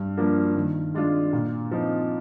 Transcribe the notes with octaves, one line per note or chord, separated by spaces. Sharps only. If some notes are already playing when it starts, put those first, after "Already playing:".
Already playing: G2
F3 A#3 D4
D#3
G#3 D4 F4
A#2
F3 C4 D#4